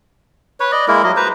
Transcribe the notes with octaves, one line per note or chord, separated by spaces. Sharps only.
B4 C#5
D5 D#5
G#3 A#3 E4 A#4
F#3 D#5
B4 C5 A#5